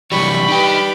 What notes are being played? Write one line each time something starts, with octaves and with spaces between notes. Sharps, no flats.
C3 E3 F#3 G3 B5 C#6
D#4 G4 B4 G5